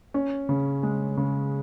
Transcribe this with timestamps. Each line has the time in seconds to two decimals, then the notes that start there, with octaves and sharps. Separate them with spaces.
0.14 C#4
0.49 C#3
0.83 G#3
1.17 C#3